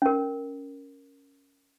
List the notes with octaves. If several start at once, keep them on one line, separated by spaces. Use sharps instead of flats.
C#4 A#4